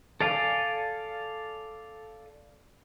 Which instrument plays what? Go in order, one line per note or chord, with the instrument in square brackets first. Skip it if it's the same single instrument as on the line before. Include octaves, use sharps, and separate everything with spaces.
[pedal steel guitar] A4 D5 F5 G#5